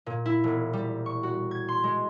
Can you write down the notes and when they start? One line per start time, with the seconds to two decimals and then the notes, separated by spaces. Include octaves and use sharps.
0.06 A#2
0.26 E4
0.44 E1
0.73 G3
1.06 C#6
1.23 F#4
1.51 G#6
1.68 C6
1.84 G#3